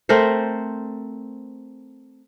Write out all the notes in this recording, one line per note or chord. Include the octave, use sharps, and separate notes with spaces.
A3 C4 A#4 C5